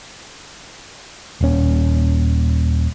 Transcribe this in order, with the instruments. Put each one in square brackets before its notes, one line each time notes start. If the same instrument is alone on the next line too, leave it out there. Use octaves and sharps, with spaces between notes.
[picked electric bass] D#1 C#4